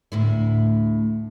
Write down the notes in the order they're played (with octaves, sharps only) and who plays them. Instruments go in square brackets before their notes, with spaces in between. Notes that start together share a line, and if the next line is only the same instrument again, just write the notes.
[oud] D2 A2 E4